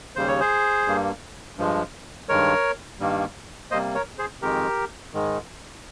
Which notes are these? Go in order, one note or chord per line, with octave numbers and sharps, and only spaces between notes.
D#2 C#3 G3 C5
C#5
G#4 C5
G2 G3 A#3
G2 F3 G#3
G2 D#3 G#3 A#4 C#5
G2 D#3 G3 A#3
C3 G3 A#3 C5 D#5
A#4 C#5
G#4 C5
F2 D#3 G#3 G4 A#4
G#2 D#3 G#3